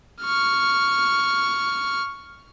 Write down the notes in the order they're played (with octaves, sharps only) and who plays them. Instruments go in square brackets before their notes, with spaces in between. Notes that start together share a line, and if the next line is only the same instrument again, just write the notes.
[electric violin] C#6 F6